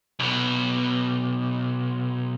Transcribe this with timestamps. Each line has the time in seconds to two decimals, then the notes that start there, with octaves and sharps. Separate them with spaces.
0.19 B1 B2